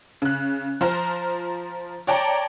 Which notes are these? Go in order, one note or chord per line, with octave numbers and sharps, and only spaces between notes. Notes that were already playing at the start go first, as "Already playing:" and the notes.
C#3 F#6
F3 C5 A#5 F6
C#5 D5 G5 A5 A#5